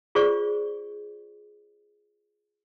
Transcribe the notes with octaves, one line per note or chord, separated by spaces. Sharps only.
F4 G#4 C5 D5 C#6